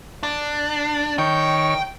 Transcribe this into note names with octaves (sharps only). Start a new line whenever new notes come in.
D4
D#3 C#5 G5